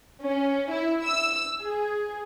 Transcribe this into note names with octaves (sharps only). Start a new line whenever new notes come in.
C#4
E4
E6
G#4